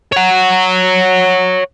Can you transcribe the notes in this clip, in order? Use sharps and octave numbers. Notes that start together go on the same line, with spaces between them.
C#5 F#5